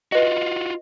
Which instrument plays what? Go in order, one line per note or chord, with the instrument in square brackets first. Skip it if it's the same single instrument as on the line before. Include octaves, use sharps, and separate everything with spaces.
[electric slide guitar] F4 F#4 [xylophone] B4 D#5